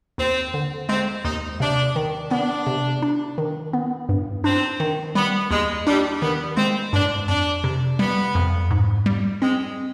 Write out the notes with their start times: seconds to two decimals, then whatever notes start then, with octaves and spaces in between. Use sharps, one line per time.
0.18 D#2 C4
0.54 D3
0.89 G#3 C4
1.24 D#2 D#4
1.60 C3 D4
1.96 D#3
2.31 B3 D4
2.67 C3
3.02 D4
3.38 D#3
3.73 B3
4.09 G2
4.44 C4 D4
4.80 D#3
5.15 G3 B3
5.50 D#2 G#3
5.87 G3 D4
6.21 D#3 B3
6.57 G#3 C4
6.93 G2 D4
7.28 F2 D4
7.64 C3
7.99 G3 B3
8.35 F2
8.71 G#2
9.06 G3
9.41 G#3 C4